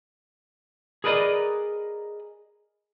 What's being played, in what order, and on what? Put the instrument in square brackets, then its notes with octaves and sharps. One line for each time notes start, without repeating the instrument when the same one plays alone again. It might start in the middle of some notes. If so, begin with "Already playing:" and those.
[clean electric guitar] G#4 A#4 B4 D5 D#5